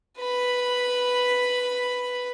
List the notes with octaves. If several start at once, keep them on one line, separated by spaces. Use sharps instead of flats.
B4 B5